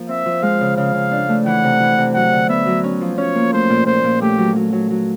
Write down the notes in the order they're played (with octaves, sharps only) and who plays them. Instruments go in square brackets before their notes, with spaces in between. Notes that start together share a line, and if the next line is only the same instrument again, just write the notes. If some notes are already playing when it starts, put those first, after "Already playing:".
Already playing: [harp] F3 A#3
[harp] C4 [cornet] E5
[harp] F3
[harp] G#3 [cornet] F5
[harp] C#3
[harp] C#3 [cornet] F5
[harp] C#3
D4
A3
[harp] E3 [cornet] F#5
[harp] C3
E3
C3
[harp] F#3 [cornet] F#5
[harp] D3
[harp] B3 [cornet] E5
[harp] F#3
C#4
F3
[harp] C#4 [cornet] C#5
[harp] A#3
[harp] A3 [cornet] C5
[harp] A#2
[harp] A#2 [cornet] C5
[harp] A#2
[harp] A3 [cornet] G4
[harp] F#3
F#3
F#3
F#3